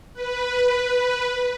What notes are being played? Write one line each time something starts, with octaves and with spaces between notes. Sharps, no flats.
B4